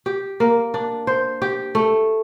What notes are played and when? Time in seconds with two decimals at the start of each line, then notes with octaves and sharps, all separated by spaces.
0.06 G4
0.40 A#3
0.74 D4
1.07 C5
1.42 G4
1.75 A3